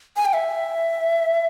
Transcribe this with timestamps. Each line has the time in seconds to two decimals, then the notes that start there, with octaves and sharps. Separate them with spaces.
0.16 G#5
0.25 G5
0.33 E5